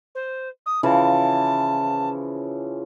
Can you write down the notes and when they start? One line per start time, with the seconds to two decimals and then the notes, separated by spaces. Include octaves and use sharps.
0.15 C5
0.66 D#6
0.83 C#3 E3 F3 A5